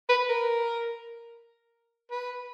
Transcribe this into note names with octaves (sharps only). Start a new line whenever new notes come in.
B4
A#4
B4